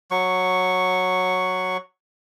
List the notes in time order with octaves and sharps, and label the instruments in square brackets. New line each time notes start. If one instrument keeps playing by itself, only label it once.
[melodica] F#3 C#6